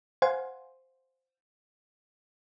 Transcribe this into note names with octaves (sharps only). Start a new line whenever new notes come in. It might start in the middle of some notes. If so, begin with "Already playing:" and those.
C5 F5 F#5 G#5 C6